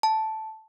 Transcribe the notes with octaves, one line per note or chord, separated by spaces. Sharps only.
A5